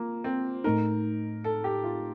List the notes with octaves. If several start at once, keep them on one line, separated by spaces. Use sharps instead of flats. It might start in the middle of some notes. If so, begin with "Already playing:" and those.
Already playing: A#3 F4
C4
A2 A3 D#4 A#4
A4
G4
F4